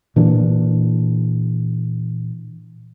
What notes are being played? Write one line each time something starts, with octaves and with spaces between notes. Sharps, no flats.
A#2 E3 D4